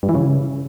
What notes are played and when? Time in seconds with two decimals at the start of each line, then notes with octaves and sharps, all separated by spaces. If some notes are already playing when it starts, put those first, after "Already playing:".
0.03 G2
0.09 E3
0.15 C#3